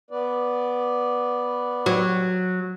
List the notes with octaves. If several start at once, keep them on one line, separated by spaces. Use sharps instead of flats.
B3 B4 D5
F#3